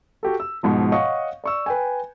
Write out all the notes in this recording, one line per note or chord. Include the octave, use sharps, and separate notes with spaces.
F#4 G4 A4
E6
G#2 B2 F3
C#5 D#5 F5 F#5 C#6 D#6
D5 C#6 E6
B4 G5 G#5